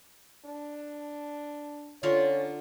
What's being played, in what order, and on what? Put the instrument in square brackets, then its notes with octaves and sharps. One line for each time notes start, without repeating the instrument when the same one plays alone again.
[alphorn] D4
[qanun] D3 F4 A#4 [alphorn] C#4 [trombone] C#5